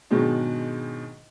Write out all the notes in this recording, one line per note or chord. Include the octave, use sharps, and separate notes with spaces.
G#2 B2 D#3 F#3 G#3 D4